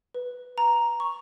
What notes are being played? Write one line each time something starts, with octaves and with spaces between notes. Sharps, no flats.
B4
A#5
C#6